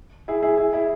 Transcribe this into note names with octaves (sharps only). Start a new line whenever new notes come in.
E4 G#4
E4 G#4
E4 G#4
E4 G#4